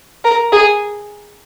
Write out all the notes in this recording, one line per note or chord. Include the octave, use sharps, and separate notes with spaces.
A#4
G#4